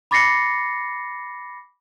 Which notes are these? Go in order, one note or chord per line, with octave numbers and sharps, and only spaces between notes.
B5 D6 A6 A#6 C7 C#7